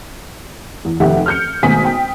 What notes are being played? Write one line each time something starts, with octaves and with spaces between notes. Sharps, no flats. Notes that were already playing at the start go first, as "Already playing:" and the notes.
E2
F1 D#2 G4 E5 F#5
F6 G6 C#7
G#1 B2 A3 G#5 D#6 B6
G5